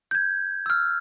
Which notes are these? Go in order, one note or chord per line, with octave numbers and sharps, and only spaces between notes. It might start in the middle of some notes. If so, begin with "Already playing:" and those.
G6 G#6
E6 F6